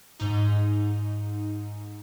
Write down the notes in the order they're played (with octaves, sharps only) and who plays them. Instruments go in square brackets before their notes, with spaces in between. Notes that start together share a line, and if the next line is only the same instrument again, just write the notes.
[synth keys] G#2 D#4